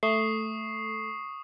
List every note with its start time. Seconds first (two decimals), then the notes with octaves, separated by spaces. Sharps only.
0.03 A3 C#6 D#6 C7